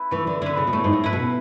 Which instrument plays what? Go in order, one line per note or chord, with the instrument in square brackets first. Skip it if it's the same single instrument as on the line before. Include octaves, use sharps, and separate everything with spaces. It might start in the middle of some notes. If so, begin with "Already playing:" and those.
Already playing: [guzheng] E4 B4
[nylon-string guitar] E3 [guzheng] A3
[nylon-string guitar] D3
[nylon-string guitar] D3 [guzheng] E4 B4
[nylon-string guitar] C#3
B2
[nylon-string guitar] A2 [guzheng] A3
[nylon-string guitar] G#2
A2
[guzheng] E4 B4
[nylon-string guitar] B2